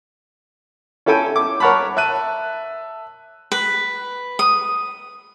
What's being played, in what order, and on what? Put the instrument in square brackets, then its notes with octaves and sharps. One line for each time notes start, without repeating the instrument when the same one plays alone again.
[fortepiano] C#4 E4 A4 G5 G#5
D6
A#4 C#5 F#5 A5 B5
[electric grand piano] E5 A5 F#6 D#7
[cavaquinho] B4
D#6